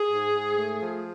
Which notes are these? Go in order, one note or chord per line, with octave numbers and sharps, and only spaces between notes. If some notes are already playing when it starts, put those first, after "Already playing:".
Already playing: G#4
G#2
G#2
A3
F3